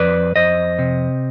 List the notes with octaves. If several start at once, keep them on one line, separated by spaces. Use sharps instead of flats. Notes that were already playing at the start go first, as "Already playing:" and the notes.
Already playing: F2 B4 D5
F2 C5 D#5
C3